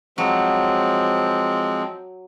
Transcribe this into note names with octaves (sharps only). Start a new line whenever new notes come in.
F3 F#3 G#3 C4